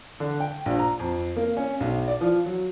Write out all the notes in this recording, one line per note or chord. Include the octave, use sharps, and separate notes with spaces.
D3
G5
A#1
A#5
F2
A#3
C#4
B1
D5
F3
F#3